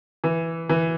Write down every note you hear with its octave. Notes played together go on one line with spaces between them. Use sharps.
E3
E3